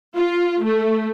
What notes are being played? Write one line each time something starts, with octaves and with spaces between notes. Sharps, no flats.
F4
A3